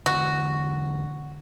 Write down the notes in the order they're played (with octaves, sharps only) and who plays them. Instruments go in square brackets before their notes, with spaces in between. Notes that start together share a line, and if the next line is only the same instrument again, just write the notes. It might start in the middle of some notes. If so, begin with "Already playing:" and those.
[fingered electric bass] E1 D3 [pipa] F#4